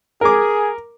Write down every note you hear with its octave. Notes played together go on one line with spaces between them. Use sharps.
G#4 A#4 D6